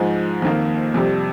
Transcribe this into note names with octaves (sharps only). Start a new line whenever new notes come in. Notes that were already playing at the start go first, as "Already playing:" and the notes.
Already playing: G#2 F3 G#3
F2 D#3 A#3
F2 C3 G3